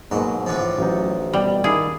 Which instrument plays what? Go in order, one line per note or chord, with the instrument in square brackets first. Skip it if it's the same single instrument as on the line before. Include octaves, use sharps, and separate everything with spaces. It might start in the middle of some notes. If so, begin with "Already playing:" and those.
[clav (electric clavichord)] G#2 B2 [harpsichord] F#3 [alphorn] A#3
[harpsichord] A2 D3 F3 [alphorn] E3
[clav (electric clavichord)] A1 D#4 [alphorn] F#3
[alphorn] B2 [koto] G3
[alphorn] D#3 [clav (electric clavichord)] E4 D5 F5 [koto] G#4